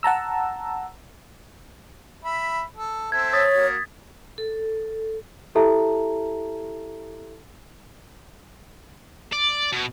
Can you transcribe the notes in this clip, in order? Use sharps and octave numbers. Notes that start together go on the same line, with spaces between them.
F#5 A5 A#5 E6
E5 B5
A4
C4 A4 E5 G#6
C#5 D#6 A6 B6
A#3 F#4
A4
E4 G4 A4 E5 A5 A#5
D5
B2